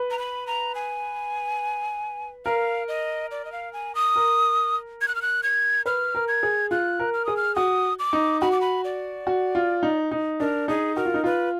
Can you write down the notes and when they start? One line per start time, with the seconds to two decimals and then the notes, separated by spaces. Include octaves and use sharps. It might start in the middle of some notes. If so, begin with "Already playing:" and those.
Already playing: B4
0.11 A#5
0.19 B5
0.47 A#5
0.75 G#5
2.45 A#4 F5
2.88 D#5
3.31 D5
3.45 D#5
3.52 F5
3.73 G#5
3.95 D#6
4.16 A#4
5.01 G#6
5.08 F#6
5.15 F6
5.22 F#6
5.43 G#6
5.86 B4 F6
6.15 A#4
6.28 G#6
6.43 G#4
6.71 F4 F#6
6.99 A#4
7.14 F6
7.25 G#4 D#6
7.37 F6
7.56 F#4 D#6
7.99 D6
8.13 D#4
8.41 F#4 B5
8.52 D6
8.61 B5
8.84 D5
9.27 F#4
9.55 F4
9.83 D#4
10.11 D#4
10.40 D4 A#4
10.68 D#4 G#4
10.96 F#4 A#4
11.06 F4
11.14 D#4
11.24 F4 B4